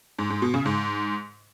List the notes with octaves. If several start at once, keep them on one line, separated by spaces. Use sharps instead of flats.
G#2
G#2
B2
C#3
G#2